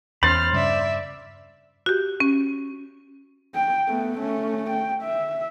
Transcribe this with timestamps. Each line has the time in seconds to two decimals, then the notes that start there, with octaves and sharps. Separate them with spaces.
0.23 E2 C#4 C5 B5 F6 A6
0.53 G2 C#3 D5 E5
1.86 F#4 G4
2.20 C#4
3.55 G5
3.88 A3 B3
4.18 A3 C#4
4.70 G5
5.03 E5